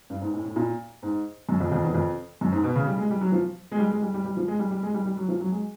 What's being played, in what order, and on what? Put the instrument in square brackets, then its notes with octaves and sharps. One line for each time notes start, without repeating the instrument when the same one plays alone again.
[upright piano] G2
G#2
A2
A2
A#2
G#2
F#2
F2
F2
E2
F2
F#2
G#2
B2
C#3
G3
G#3
G3
F#3
F3
G#3
G3
G#3
G3
G3
G3
F3
G#3
G3
G3
G#3
G3
G3
F#3
F3
F#3
G#3